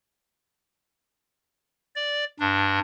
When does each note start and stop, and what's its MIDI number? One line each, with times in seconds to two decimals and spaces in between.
1.96 2.24 74
2.40 2.79 43
2.40 2.79 62